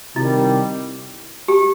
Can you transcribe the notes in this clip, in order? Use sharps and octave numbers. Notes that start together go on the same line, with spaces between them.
C3 D#3 G3 E4
G4